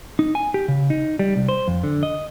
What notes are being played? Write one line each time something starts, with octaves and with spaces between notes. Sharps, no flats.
D#4
G#5
G4
C#3
D#4
G3
C2
C5
F2
D3
D#5